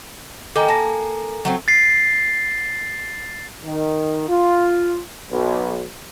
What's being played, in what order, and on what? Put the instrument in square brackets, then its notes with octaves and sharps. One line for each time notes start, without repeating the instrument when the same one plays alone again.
[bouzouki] D#3 G5 [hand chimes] A4 G#5 A#5 [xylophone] D6
[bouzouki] A#3 [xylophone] A5 A#6
[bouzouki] F#3 A3 C4
[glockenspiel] A6 C7
[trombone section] D#3
F4
B1